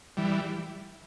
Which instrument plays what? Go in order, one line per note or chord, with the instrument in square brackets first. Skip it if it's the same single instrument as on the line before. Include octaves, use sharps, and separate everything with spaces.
[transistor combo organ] E3 G3